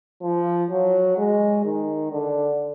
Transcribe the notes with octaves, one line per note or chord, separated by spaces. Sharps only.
F3
F#3
G#3
D#3
D3